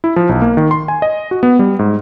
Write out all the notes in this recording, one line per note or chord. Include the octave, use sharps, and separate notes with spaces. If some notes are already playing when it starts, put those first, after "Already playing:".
E4
F3
B1
A#3
D#3
C6
G#5
D#5
F#4
B3
G3
G#2